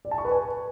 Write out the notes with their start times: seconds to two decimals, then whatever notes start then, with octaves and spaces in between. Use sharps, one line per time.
0.05 D5
0.11 A5
0.18 C#6
0.25 B4
0.31 G#5